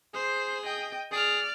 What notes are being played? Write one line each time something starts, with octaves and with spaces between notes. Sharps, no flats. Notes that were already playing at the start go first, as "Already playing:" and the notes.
G#4 C5
D#5 G5
G#4 D5 F6